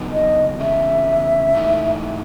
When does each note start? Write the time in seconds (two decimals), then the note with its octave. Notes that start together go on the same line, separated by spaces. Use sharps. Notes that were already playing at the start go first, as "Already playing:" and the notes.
Already playing: C#3 F#3 B3 D#4
0.12 D#5
0.59 E2 C#3 G#3 E5
1.53 G#2 E3 A3 D#4